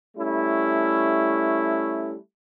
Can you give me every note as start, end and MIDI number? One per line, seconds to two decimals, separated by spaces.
0.17 2.15 55
0.17 2.15 57
0.17 2.15 61
0.17 2.15 64